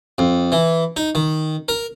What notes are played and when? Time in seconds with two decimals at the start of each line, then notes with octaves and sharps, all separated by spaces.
0.18 F2
0.52 E3
0.97 D#4
1.15 D#3
1.68 A#4